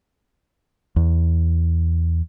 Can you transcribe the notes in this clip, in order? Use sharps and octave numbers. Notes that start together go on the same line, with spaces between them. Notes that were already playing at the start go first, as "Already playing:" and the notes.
E2